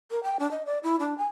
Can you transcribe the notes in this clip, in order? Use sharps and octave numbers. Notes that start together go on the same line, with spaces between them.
A#4
G5
D4
D#5
D5
E4
D4
G#5